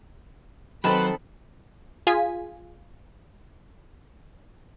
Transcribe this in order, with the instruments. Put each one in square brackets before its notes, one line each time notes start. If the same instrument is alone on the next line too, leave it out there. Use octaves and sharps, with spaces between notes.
[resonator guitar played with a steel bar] D#3 A4 [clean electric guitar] F#3 A5 [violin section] C4 C5 B5 [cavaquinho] B4
[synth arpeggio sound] F4 G#4 G#5 B6